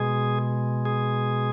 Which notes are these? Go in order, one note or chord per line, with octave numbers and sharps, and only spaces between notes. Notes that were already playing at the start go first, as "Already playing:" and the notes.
Already playing: B2 G#3 G#4
G#4